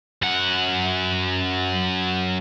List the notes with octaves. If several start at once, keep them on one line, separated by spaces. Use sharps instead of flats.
F#2 F#5